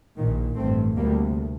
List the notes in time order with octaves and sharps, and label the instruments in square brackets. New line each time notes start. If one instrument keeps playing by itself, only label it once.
[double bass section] A#1 A#2 D#3
A1 G2 A3 C4
D2 C3 G3 A#3